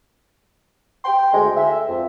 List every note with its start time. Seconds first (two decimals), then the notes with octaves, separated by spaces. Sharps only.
1.05 G5 C6
1.34 D2 G#3
1.56 E5
1.89 F2